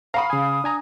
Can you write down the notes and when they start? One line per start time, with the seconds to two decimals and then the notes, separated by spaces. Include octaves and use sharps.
0.14 F5 F#5 A#5 B5 C#6 D#6
0.30 C#3 G#5 D#6
0.64 D4 G#5 A#5